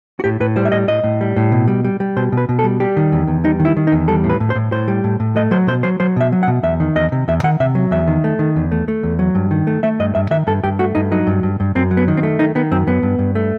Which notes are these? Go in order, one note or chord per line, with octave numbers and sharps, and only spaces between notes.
F#4
A2 G4
A2 B4
G3 C5
E5
A2 D#5
A2 D#5
A2
G3
A2
B2
G3
G3
G3
B2 C5
B2
B4
B2
A4
G3
G3 G4
D#3
E2
E2
G3 D#4
D#3
E4
D#3
D#4
E2
G3 A4
A2
B4
A2
C5
A2
A2 C5
G3
A2
A2
A3 D#5
F#3 C5
B2 C5
F#3 C5
F#3 C5
B2 E5
F#3
F#5
B2
E2 E5
D#3
E2 D#5
C3
E2 E5
D#3 F#5
C3 E5
F#3
E2 E5
D#3
A3
D#3
E2
A3
A3
E2
F#3
G2
D#3
A3
A3 E5
G2 D#5
G2 E5
D#3 E5
G2 A4
G2 G4
A3 F#4
G2 D#4
F#3 D#4
G2
G2
G2
F#2 C4
F#3
B3
D#3
C4
A3
D#3 D#4
D#3 B3
F#2 C4
F#2 B3
G2
G2
A3